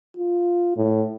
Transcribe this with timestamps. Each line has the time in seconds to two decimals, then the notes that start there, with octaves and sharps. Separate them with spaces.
0.17 F4
0.77 A2